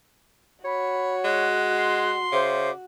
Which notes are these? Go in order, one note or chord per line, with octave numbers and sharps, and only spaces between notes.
F#4 C#5 B5
G#3 F#6
C6
C#3 C5 E5 D6